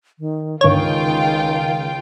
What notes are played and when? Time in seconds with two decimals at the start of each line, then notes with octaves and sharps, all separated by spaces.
0.19 D#3
0.61 G1 C#2 D#3 F4 C#5 G5